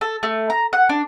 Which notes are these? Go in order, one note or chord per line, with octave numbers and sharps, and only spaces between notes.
A4
A3
A#5
F#5
D4